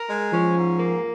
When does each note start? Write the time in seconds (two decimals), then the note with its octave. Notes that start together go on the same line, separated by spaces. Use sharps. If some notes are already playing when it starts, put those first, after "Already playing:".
Already playing: A#4
0.09 G#3
0.32 F3 C#4
0.56 G#2
0.79 A#3